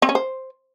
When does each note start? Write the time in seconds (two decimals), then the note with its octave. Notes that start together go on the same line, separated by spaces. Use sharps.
0.02 C4
0.09 C#4
0.15 C5